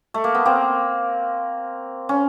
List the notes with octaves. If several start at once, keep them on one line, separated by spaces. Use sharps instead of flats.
A3
A#3
B3
A#3 C4
C#4